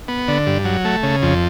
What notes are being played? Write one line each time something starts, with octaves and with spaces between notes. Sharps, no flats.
B3
D3
G2
F#3
A3
C#3
F2